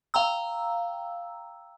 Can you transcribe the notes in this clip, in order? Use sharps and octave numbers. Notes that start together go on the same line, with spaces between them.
F5 G5 A#5 E6